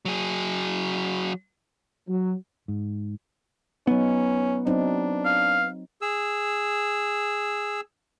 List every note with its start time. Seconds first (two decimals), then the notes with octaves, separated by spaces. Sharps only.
0.05 F#3 G#4
2.08 F#3
2.68 G#2
3.87 F#3 B3 C#4 D#4
4.67 F#3 C4 D4 D#4
5.25 F5
6.02 G#4 E6